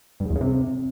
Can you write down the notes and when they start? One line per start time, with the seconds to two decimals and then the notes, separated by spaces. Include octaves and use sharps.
0.20 G2
0.25 G#2
0.30 E2
0.36 C#3
0.41 C3